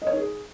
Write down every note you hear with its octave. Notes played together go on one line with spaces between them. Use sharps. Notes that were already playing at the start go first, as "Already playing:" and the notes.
D#5
C#5
D#4
G#4